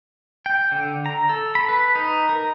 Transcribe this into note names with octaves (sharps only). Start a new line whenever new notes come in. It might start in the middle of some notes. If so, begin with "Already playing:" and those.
G5
D3
A#5
A4
B5
B4
D#4
A#4